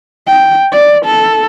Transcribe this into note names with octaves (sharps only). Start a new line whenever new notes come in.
G5
D5
A4